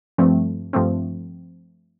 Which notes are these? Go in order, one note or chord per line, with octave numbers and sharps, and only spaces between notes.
G2 F3 A3 C4
G2 F3 A3 C4